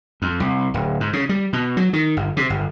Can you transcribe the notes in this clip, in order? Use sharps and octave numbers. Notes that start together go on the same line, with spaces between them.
F2
C2
D1
G#2
C#3
G3
B2
F#3
D#3
G1
C3
G1